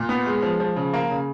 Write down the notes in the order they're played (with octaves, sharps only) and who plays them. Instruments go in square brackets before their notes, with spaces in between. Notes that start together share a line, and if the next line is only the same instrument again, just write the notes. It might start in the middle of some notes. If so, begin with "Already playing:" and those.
Already playing: [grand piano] A#2
B3
G#3
F3
F3
C#3
A#3
C#3